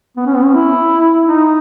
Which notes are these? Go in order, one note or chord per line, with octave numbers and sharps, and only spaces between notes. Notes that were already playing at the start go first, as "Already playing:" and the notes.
B3
C#4
B3
C#4
E4
D#4